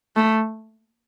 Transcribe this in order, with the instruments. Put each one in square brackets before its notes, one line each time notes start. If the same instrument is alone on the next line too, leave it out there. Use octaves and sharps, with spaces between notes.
[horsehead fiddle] A3